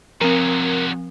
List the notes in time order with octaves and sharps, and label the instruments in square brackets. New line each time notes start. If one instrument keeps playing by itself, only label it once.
[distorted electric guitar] C3 F#3 [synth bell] F3 C4 [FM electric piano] A#4